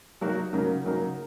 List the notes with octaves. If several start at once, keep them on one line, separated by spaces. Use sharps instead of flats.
F#3 A#3 D#4 F#4 A#4
C#3 F#3 A#3 D#4 A#4
C#3 F#3 A#3 D#4 A#4